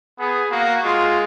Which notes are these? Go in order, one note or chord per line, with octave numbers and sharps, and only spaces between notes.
B3 G#4
A#3 F#4
G#3 F4